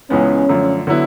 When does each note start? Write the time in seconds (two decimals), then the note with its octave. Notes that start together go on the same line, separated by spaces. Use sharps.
0.10 C#2 C#3 E3 G#3 B3 C#4
0.48 F#2 D3 F3 A3
0.87 D3 F#3 B3 E4